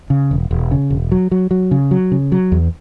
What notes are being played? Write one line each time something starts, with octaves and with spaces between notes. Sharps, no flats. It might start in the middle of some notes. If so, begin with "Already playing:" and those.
C#3
E1
E1
C#3
E1
F#3
F#3
F#3
C#3
F#3
C#3
F#3
E2